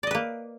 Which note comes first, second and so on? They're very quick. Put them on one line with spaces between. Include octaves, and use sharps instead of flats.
D5 D#5 B4 A#3